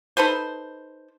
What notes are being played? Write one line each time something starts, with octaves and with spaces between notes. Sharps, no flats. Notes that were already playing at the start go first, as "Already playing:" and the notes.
D#4 A4 B4 C5